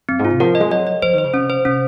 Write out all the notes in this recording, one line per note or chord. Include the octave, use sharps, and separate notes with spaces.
F#2 C4
G#2
F4
C3
F3 A#4
D#5
G#3
F#3 D#5
D#5
F3 C5
D#3
C5
C#3
C3 C#4
C5
C3 C#4